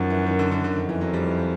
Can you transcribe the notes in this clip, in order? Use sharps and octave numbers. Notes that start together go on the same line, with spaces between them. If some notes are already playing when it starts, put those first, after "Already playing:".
Already playing: F#2 D#3 F3
E3
D#3
D3
D3
D3
F2 D#3
E3
F#3
G3
E3